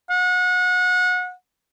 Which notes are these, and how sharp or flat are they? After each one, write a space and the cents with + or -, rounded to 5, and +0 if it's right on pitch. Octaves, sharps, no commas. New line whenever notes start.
F#5 -30